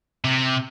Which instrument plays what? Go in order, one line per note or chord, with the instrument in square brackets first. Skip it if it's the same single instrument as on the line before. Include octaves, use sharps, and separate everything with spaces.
[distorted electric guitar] C3